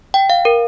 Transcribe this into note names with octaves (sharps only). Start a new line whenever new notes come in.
G5
F5
A#4